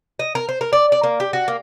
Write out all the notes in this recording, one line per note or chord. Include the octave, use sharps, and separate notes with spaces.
D#5
A#4
C5
A#4
D5
D5
A#3
G4
F#4
A#3